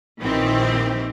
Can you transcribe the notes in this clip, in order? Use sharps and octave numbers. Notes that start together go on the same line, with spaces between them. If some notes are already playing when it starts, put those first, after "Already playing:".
A#1 D#3 E3 C4 G4